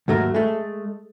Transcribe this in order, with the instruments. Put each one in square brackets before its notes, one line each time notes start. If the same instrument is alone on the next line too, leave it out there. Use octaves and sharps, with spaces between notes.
[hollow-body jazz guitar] D#2 G#2 F#3 A3 A#4
G#3 A3